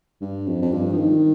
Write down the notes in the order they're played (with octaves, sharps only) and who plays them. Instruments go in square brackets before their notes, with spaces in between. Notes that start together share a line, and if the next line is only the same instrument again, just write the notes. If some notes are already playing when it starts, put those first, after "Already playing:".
[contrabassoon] G2
F2
F2
G2
F3
D#3